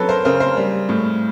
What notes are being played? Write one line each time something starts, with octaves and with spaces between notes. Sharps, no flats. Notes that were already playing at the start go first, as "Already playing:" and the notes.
Already playing: F#3 C#4 A4 B4
A#4 C5
C#3 A#4 C5
A#4 C5
G3
A2